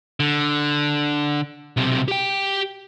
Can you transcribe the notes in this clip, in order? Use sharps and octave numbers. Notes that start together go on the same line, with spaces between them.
D3
B1 C3
G4 G5